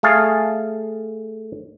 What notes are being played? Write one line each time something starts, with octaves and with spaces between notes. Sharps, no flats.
A3 G#4 F5 A5